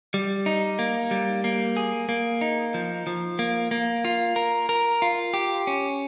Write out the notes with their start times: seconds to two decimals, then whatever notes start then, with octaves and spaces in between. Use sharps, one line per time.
0.14 G3
0.46 D#4
0.79 A#3
1.11 G3
1.44 A#3
1.77 G#4
2.09 A#3
2.41 D#4
2.74 F3
3.07 F3
3.39 A#3
3.71 A#3
4.05 F4
4.36 A#4
4.69 A#4
5.02 F4
5.34 G4
5.67 C#4